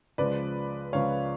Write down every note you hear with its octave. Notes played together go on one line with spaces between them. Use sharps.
C#2 C#3 F3 G#3 B4 D5
C#2 C#3 F3 G#3 C#5 F5